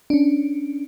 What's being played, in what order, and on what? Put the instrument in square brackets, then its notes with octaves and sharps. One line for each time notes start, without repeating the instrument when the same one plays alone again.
[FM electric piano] C#4 D4